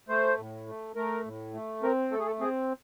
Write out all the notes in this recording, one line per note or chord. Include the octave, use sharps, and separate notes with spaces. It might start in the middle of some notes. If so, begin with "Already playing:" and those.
A3 C5
A2
A3
A3 A#4
A2
A3
C4 A#4
A3 A4
G#4
A4
C4 G#4